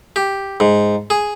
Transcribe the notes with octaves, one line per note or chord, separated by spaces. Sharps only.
G4
G#2
G#4